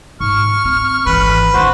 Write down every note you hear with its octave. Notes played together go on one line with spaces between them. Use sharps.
G#2 C#6 F6
C4
G#1 E3 B4
D#3 D4 F#4 C5